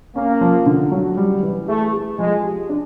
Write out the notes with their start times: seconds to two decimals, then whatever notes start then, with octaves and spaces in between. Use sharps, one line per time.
0.15 A#3 C#4
0.41 F3
0.66 D3
0.92 F#3
1.17 G3
1.43 E3
1.68 A3 G#4
1.94 G#4
2.19 F3 G#3
2.44 G4
2.69 D4